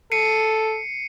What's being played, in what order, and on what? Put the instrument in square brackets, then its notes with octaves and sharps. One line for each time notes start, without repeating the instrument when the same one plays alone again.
[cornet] A4 [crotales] C7 C#7 D#7